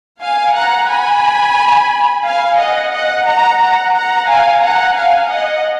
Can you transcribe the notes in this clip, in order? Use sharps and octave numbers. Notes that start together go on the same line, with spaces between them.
F5 G#5
F#5 A#5
G#5 B5
F5 G#5
D#5 F#5
D#5 F#5
F#5 A#5
F#5 A#5
F#5 A#5
F5 G#5
F#5 A#5
F5 G#5
D#5 F#5